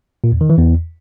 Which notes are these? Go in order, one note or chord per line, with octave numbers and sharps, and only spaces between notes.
A#2
E2
D#3
E3
E2